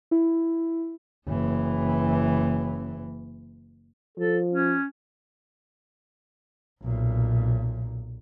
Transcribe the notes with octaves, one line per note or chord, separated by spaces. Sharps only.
E4
F#1 E3
F3 A4
C#4
B1 A#2